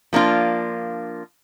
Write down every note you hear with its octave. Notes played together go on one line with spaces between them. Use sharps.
F3 A#3 D4 F4